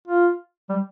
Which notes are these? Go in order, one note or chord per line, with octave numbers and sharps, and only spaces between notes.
F4
G3